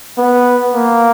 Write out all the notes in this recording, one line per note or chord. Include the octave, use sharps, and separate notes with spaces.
B3
A#3